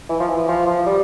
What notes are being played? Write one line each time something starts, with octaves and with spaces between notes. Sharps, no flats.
E3
F3
E3
F3
F3
G3